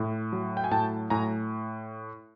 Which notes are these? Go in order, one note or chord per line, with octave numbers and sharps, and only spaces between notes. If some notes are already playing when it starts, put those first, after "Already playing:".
Already playing: A2
F#3
G5
G#5
A2 G5 A5
A2 G#5 A#5